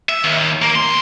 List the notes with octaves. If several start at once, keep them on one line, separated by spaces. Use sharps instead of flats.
E5
D#2
A#3
B1 C6